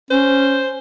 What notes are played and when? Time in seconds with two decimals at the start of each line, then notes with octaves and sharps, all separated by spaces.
0.11 C#4 C5